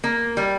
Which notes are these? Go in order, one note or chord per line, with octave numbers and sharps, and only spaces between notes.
A#3
G3